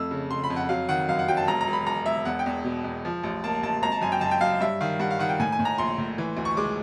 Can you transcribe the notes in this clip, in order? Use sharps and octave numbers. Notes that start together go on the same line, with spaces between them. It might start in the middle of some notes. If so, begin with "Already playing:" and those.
Already playing: F2 A3 E6
C#3
C#3 C6
B5
F2
F#5
F#3 F5
D#3 F#5
F#2 F5
F#5
F#3 G5
A5
E1 A#5
A#5
E1
B5
E1 A#5
E1 E5
E2 F#5
G5
E2
B2
E2
F3
A1
A#3 A5
A1 A5
G#1 A#5
A5
F#2 G#5
G5
F#2 A5
G5
F#2 F5
G2 E5
D#3 F5
G2 F#5
F5
D#3 F#5
G5
A2 G#5
G#5
A2
A#5
A#1 C6
A2
E3
D2
C#6
G#3 D6